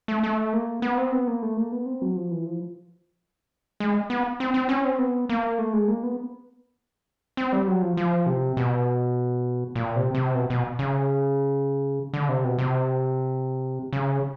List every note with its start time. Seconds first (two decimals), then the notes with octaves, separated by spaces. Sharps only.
0.08 A3
0.23 A3
0.53 A#3
0.82 B3
0.98 C4
1.12 B3
1.27 A#3
1.42 A3
1.57 A#3
1.72 B3
1.86 C4
2.02 F#3
2.16 F3
2.31 E3
2.46 F3
3.80 G#3
4.10 B3
4.40 C4
4.54 C4
4.69 C#4
4.85 C4
4.98 B3
5.29 A#3
5.59 A3
5.73 G#3
5.88 A#3
6.03 B3
7.37 C4
7.53 G3
7.67 F#3
7.82 F3
7.97 F3
8.26 C3
8.57 B2
9.75 A#2
9.96 C3
10.15 C3
10.35 B2
10.50 B2
10.79 C#3
12.13 D3
12.29 C3
12.44 B2
12.58 C3
13.93 C#3